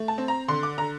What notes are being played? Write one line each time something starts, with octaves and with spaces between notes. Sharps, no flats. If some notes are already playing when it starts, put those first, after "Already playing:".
Already playing: A3
A5
C4
A#5
D3 C6
D6
D3 A#5